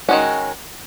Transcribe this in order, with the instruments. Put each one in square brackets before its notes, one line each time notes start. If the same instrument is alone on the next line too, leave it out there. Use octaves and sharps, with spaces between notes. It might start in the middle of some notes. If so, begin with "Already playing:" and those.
[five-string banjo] D#3 G#3 C#4 F#4